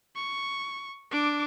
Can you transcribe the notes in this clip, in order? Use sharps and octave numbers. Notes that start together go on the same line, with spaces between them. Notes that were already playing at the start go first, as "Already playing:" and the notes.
C#6
D4 D6